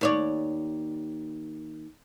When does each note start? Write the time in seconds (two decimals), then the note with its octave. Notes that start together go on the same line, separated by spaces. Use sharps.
0.01 D#2 C#5 D5